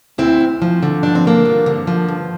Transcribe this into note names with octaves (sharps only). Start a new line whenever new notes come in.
D2 C4 E4
D2
F3
D3
G2 D4
C4
G2 A#3 D4
F3
D3
F3
G2